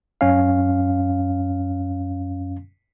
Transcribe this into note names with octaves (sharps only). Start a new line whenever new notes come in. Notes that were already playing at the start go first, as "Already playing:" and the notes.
F#2 C#4 F5